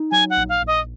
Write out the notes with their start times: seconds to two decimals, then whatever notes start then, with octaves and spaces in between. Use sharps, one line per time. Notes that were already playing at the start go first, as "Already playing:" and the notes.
Already playing: D#4
0.11 F#3 G#5
0.30 F#5
0.37 A#1
0.49 F5
0.62 A#1
0.67 D#5